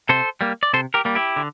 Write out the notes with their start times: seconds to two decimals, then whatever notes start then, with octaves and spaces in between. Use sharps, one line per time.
0.09 C3 A4 C5
0.41 G3 A#3
0.63 D5
0.73 C3 A4 C5
0.94 G4 A#4
1.05 G3 A#3
1.15 E4 G4
1.36 D3